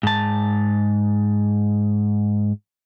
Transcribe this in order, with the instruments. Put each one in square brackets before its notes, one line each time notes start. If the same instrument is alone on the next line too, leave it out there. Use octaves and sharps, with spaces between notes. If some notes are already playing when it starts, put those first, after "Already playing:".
[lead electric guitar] G#2 A5